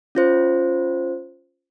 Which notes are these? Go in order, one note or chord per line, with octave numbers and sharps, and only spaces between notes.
C#4 F4 C5